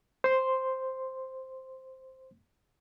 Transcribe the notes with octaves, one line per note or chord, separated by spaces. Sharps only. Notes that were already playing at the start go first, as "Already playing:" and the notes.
C5 C6